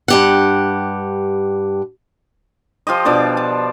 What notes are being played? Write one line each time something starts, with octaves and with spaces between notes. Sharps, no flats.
G2 G4 F#5
F3 F4 G4 D#5
B2 F3 D4 D6
A5